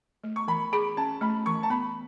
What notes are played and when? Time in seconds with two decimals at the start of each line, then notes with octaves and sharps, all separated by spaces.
0.24 A3
0.36 C#6
0.48 E3 B5
0.72 G#4 B5
0.97 C#4 A5
1.21 A3 B5
1.46 E3 C#6
1.63 A5
1.70 B3 B5